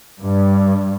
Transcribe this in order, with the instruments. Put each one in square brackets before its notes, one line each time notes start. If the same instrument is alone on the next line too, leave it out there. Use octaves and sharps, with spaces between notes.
[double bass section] G2